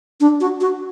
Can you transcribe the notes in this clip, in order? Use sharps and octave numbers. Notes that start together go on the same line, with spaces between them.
D4
F#4
F#4